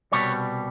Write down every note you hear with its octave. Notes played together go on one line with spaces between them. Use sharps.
C2 B2 G3 C#5